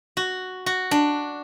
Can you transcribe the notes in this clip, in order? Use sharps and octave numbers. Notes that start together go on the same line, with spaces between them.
F#4
F#4
D4